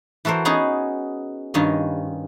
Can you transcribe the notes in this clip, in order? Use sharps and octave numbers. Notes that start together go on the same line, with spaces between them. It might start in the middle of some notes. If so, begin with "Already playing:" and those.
E3 F#4 A4 A#4 C5
B3 C#4 D#4 G#4
G2 D#3 C#4 F4 D#5